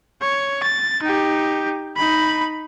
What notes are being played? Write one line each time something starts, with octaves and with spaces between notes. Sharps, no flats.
C#5
A6
D#4 G4
D#4 B5